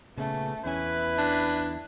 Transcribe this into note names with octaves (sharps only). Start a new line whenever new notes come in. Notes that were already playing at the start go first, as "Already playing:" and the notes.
A#2 C#3 A3 B3
E2 C#4 E4 B4 G#5
D4